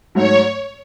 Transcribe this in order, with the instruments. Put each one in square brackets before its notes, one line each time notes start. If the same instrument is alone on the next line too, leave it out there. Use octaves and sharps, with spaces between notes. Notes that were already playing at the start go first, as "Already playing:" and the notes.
[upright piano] G#2 F#3 A3 [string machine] C#5